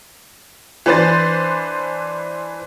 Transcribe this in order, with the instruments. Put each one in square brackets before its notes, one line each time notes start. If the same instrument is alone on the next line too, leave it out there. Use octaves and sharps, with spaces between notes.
[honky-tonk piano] E3 D4 B4 C5 A6